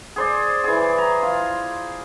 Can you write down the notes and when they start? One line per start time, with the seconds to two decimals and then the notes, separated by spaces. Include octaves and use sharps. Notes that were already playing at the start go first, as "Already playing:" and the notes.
0.16 G#4 C5 D5
0.64 E3 G#4
0.98 A#5
1.23 F4